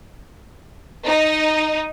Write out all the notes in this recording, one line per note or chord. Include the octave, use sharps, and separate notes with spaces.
D#4